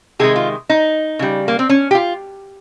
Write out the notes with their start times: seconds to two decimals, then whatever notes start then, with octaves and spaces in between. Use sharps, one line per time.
0.19 C3 D#3 G#3 G#4
0.36 F4
0.69 D#4
1.19 C#3 G3
1.48 A#3
1.59 C4
1.69 C#4
1.91 G4
1.95 F4